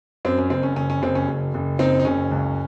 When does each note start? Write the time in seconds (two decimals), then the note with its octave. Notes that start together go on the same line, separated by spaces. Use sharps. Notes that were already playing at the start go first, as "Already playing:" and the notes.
0.25 F#2 C4
0.38 C#4
0.50 F#1 C4
0.63 C#4
0.76 F#1 C#4
0.90 C#4
1.02 F#1 C4
1.15 C#4
1.27 F#1
1.54 F#1
1.79 F#1 C4 D#4
2.00 D#4
2.05 F#1 C#4
2.31 C#2